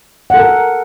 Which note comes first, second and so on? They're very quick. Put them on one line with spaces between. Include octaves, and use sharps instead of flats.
F#5 A4 A#4